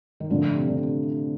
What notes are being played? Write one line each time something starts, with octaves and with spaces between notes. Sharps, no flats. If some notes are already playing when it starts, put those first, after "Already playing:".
D#3
A2 D3 F3 A3 D4
C3
D3
C3